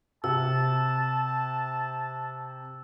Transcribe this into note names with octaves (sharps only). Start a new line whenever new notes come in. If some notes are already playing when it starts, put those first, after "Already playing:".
C3 A5 E6